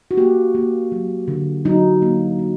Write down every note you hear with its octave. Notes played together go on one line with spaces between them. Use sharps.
F#4
A#3 G4
A#3
F#3
D3
F#3 D#4
A#3
A#3